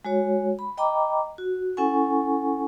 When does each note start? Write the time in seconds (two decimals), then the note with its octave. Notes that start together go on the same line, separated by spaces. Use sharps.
0.05 G#3 F#4 C#5
0.59 B5
0.77 D#5 G5 A#5 B5 D6
1.38 F#4
1.77 C#4 E4 A4 F#5 G#5 C#6